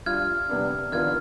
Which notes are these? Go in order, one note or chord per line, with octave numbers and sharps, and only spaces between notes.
G3 D4 F4 F6 G#6
C3 G3 B3 D4
D#3 B3 D4 F4 F6 G#6